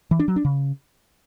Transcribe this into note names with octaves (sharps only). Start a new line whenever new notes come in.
E3
D4
F#3
D4
C#3